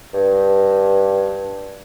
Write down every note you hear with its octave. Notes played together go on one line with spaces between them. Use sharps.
G2